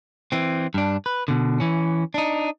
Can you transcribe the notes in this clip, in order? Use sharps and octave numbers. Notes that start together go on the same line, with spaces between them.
E3 C4
G2 D4
B4
B2 D3
E3 C#4
D4 D#4